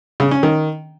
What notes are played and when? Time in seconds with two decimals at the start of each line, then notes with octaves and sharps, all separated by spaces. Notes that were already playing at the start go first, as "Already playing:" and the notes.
0.20 C#3
0.31 C#4
0.43 D#3